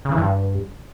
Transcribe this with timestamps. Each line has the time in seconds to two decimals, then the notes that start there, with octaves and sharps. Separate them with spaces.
0.05 C#3
0.12 E3
0.18 G2